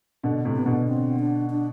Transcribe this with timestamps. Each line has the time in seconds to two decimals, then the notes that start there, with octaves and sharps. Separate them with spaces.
0.23 B2 D3
0.45 A2 C3
0.56 B3
0.66 B2 D3
0.88 C4
1.19 D4
1.50 D4